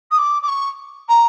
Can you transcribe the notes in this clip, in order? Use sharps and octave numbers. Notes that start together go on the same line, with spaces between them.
D#6
D6
D6
C#6
A#5